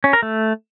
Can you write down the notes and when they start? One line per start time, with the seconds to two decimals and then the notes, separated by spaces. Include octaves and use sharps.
0.04 C#4
0.13 A#4
0.23 A3